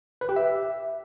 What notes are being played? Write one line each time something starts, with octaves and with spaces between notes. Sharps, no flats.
B4
G4
E5